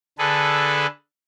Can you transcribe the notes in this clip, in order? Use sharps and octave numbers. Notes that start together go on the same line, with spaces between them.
D3 G#4 A4 B4